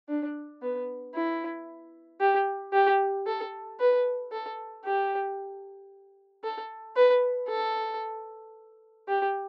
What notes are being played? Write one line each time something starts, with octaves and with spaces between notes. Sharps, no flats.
D4
B3
E4
G4
G4
A4
B4
A4
G4
A4
B4
A4
G4